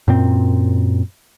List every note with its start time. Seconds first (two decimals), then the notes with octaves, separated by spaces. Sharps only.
0.08 F#2 A#2 C4